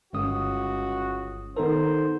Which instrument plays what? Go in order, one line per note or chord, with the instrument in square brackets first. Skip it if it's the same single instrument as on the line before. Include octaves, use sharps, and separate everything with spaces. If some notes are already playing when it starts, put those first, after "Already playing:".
[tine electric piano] G1 D#6 [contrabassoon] C#2 [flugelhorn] F#4
[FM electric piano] D#3 A#4 [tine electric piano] B3 D#4 A4 [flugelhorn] C5